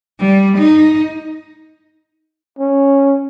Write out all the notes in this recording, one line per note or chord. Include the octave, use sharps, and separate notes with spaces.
G3
D#4
C#4